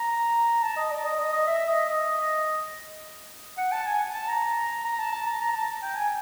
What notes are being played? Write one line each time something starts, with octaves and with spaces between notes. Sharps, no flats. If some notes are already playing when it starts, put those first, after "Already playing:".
Already playing: A#5
A5
D#5
D5
D#5
D#5
D#5
E5
D#5
D#5
F#5
A5
G#5
A5
A#5
A#5
A5
A5
A#5
A#5
A5
G5
G#5